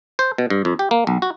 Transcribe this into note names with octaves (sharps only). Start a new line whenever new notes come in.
C5
B2
G2
F2
G4
A#3
B1
F#4